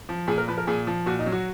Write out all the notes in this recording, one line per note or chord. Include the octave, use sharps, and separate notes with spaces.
F3
A#2 G#4
A#4
F3 B4
A#4
A#2 G#4
F3
A#2 F#4
D#4
F#3
F#4